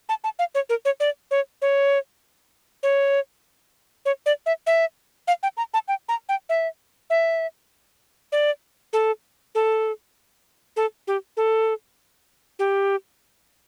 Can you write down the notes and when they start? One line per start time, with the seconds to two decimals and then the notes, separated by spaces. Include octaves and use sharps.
0.09 A5
0.24 A5
0.39 F5
0.55 C#5
0.69 A#4
0.85 C#5
1.00 D5
1.31 C#5
1.62 C#5
2.83 C#5
4.05 C#5
4.26 D5
4.46 E5
4.67 E5
5.28 F5
5.43 G5
5.57 A#5
5.74 A5
5.88 G5
6.09 A#5
6.29 G5
6.49 E5
7.10 E5
8.32 D5
8.93 A4
9.55 A4
10.76 A4
11.07 G4
11.37 A4
12.59 G4